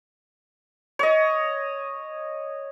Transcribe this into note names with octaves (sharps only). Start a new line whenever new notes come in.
C#5 D#5